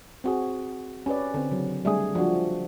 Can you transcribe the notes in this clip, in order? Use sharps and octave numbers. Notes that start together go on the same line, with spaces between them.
C4 F#4 G#4
C#4 G4 B4 D5
D3 C4
C#3 F#3
G3 A3 D4 G#4
F3 D4 F#4